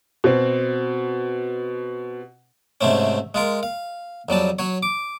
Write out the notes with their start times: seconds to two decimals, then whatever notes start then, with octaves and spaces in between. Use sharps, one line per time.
0.24 B2 C4
2.81 G#2 C3 A3 C4 C#4
3.34 G#3 F4 A#4
3.63 F5
4.29 F2 F#3 G3 A5
4.59 F#3 C#5
4.83 D6